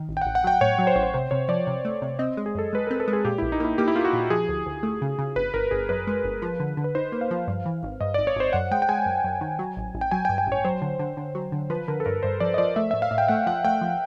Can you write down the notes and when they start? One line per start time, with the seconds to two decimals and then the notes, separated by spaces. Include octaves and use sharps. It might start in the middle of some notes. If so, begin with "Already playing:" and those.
Already playing: D#3
0.09 A1
0.17 G5
0.22 A1 F#5
0.35 F#5
0.44 F#3 G5
0.61 A2 C#5
0.79 F#3
0.87 C5
0.96 A1 C#5
1.03 C5
1.14 C3 C5
1.31 C3 C#5
1.48 F3 D5
1.67 C3
1.85 A3
2.02 C3
2.19 C4 D#5
2.37 G#3
2.46 G#4
2.55 F#2 A4
2.73 G#3 B4
2.87 C4 A#4
3.00 A4
3.08 G#3
3.13 G#4
3.25 A#2 G4
3.38 A#1 E4
3.52 D#4
3.60 A#3 E4
3.78 A#3 G4
3.88 E4
3.95 A#3 F4
4.05 F#4
4.13 A#2
4.30 F3 G#4
4.49 D2
4.66 D2
4.83 A3
5.02 C#3
5.19 C#3
5.36 G1 B4
5.54 G1 A#4
5.71 G1 G#4
5.89 F#2 B4
6.07 G#3
6.24 G1
6.42 F3
6.60 D3
6.77 D3
6.84 B4
6.95 D#4 C5
7.12 A#3
7.21 F5
7.31 F3
7.47 G2
7.65 E3
7.83 G#1
8.01 G2 D#5
8.14 G#1 D5
8.27 C#5
8.36 G#1 C5
8.53 F#2 F#5
8.71 G#3 G5
8.82 G5
8.89 G#3 G#5
9.06 F#2
9.24 F#2
9.41 D#3
9.59 F#3
9.77 A1
9.95 A1
10.01 G5
10.11 F#3 G#5
10.25 G5
10.29 G2
10.38 G5
10.47 A1
10.52 C#5
10.65 F#3 C5
10.82 D3
10.99 D3
11.17 D3
11.35 F#3
11.52 D3
11.70 F3 B4
11.88 D3 A#4
12.00 A4
12.06 G2 A#4
12.23 G2 C5
12.40 F3 D5
12.54 D#5
12.58 F3 D5
12.76 A3 E5
12.91 A2 E5
13.02 F5
13.11 A2
13.18 G5
13.28 A3 F#5
13.46 F3 F#5
13.64 A3 G5
13.81 F3